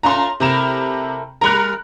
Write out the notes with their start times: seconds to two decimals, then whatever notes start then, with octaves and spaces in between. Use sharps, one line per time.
0.03 A3 C#4 F4 A#5 C6
0.40 C3 A3 E4 A#4 A#5 E7
1.41 G3 A#4 A#5 B5 F#6